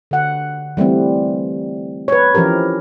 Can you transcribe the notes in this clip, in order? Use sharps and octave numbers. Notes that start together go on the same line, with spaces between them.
D3 F#5
E3 G3 A3 C4
B4 C#5
E3 F3 C#4 G4 A#4